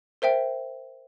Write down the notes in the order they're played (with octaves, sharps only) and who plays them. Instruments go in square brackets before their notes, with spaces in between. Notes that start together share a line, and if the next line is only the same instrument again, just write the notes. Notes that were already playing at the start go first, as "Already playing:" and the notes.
[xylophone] A#4 C5 E5 G5